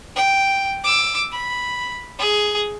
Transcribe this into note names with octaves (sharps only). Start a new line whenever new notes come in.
G5
D6 E6
B5
G#4